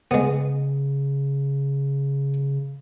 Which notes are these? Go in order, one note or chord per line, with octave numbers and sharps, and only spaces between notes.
C#3 G#3 B3